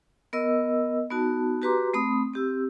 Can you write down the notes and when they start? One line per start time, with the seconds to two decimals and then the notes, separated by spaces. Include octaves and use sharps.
0.33 B3 A#4 D#5 E6
1.10 B3 D#4 F#4 A5
1.62 F#4 G4 B4 A#5 C6 D6
1.94 A3 C4 B5 D#6
2.33 C4 G4 E6